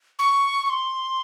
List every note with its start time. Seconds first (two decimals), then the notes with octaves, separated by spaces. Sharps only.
0.19 C#6
0.66 C#6
0.70 C6